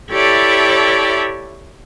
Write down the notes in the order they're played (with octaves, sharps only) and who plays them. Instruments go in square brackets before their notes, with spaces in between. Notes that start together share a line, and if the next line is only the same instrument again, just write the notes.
[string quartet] E4 G4 A4 C#5 D5 E5